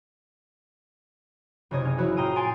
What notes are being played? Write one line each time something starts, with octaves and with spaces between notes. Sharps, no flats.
F#1 C3 C#5 D#5 G#6
C#4
F#3 E4 F#4 B4
A#2 F4 G5 A#5 D#6 D#7
G#5 C6 A6 D7